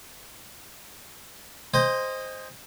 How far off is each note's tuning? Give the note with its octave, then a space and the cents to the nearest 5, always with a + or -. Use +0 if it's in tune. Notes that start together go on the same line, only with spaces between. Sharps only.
C5 +0 D#5 +0 G#5 -45